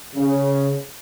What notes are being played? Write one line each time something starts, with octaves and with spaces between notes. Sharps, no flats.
C#3